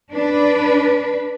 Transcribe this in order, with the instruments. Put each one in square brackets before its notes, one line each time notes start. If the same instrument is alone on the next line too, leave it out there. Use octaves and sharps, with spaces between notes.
[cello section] D4 B4